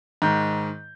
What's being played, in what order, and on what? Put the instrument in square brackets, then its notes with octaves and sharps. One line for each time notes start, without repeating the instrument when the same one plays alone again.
[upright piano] G#2 D#3 G6